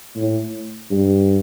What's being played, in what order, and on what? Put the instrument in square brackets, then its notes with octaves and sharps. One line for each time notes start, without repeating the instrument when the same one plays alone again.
[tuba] A2
G2